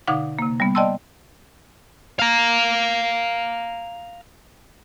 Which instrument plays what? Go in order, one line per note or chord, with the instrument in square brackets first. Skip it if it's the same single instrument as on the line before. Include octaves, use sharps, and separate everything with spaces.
[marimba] B2 D3 D#4 F5 F#5 D6
C3 A#3
G3 B3
D5 D#5 G5 A5 C6 E6
[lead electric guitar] F5 A#5